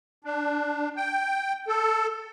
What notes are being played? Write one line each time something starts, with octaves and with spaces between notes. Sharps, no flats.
D4
G5
A4